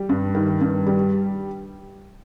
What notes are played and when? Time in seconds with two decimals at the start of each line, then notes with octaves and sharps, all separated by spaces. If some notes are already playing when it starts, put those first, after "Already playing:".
Already playing: G3
0.09 G2
0.35 D#3
0.61 G2
0.87 G3